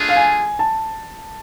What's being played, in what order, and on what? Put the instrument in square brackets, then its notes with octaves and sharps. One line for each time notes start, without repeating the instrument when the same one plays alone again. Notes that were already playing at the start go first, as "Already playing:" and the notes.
Already playing: [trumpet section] A3 D4 F4 G#4
[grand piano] F5
G#5
A5